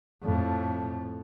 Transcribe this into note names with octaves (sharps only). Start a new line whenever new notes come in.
F2 A2